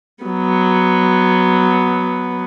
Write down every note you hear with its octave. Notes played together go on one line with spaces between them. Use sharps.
F#3 B3